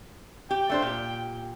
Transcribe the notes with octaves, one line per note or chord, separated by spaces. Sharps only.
G4 G5
A3 D4 C5
A#2 G4